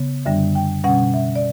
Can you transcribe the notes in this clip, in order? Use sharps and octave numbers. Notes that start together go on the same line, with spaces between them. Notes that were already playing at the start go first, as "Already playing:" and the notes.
Already playing: C#3 B3
F#2 D3 G3 D4 E5
G5
B2 G3 C#4 F#5
E5
D5